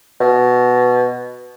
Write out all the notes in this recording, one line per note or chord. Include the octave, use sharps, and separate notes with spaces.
B2